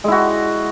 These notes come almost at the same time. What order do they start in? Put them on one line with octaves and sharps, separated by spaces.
G#3 E4 F#4